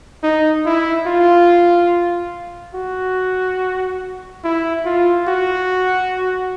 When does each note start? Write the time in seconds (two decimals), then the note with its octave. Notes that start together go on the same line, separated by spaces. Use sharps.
0.23 D#4
0.66 E4
1.07 F4
2.75 F#4
4.44 E4
4.86 F4
5.28 F#4